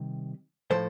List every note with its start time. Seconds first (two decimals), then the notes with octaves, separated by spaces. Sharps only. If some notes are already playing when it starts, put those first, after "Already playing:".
Already playing: C3 D#3 G3
0.71 A2 F3 A4 C5